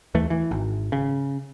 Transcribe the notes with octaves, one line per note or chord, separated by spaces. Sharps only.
D#2 E3 A3
E3
G#1
C#3